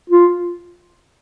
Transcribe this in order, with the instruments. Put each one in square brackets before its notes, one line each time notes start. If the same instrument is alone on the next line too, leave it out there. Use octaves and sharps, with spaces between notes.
[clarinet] F4